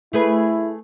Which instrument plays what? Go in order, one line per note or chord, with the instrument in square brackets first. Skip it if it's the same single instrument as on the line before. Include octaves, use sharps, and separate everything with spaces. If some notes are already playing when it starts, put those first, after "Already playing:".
[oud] A3 G#4 B4 [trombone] E4